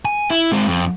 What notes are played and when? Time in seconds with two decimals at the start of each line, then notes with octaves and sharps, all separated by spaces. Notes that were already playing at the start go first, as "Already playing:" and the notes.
0.05 G#5
0.30 E4
0.52 G#3 C4
0.67 F2